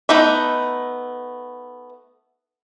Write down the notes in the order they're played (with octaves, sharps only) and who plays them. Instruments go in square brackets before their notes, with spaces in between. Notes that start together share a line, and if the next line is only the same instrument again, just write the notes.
[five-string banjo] A3 B3 D#4 E5